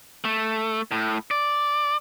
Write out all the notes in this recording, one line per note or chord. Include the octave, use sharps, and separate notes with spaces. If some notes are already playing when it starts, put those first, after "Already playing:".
A3
A2
D5